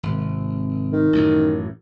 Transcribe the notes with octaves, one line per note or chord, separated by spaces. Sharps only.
G#1 C3
D#3
A1 F#2